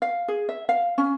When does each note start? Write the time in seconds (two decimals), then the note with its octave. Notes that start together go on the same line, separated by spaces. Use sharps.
0.02 F5
0.28 G#4
0.49 E5
0.69 F5
0.98 C#4